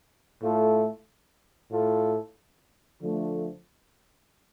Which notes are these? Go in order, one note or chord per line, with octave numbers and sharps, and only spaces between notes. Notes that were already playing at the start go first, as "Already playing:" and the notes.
A2 A3 F4 A4
A2 A3 F4 A4
D3 F3 A3